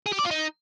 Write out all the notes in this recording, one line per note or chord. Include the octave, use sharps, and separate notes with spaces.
G#4
G4
D5
F4
D#4